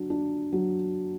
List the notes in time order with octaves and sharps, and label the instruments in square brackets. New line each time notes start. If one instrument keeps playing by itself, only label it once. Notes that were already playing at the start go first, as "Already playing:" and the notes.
Already playing: [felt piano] F#3 D4
D4
F#3